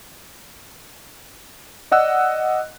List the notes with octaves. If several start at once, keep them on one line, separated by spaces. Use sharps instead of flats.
D5 D#5 F#5 E6 F#6